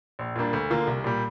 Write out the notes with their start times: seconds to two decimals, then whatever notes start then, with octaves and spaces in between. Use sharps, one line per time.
0.19 A#1
0.36 A#2 G3 A#3 D4
0.53 D2
0.70 D3 A#3 F4
0.87 C2
1.04 A#2 G3